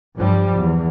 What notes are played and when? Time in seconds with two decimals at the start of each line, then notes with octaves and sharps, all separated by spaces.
0.16 G2 F3 G3
0.56 E2